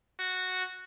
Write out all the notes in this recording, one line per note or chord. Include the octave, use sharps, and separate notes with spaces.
F#4